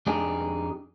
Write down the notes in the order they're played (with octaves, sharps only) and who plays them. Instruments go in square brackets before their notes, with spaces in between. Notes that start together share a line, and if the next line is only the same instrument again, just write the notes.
[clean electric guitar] F2 D4 D#4 G4 G#4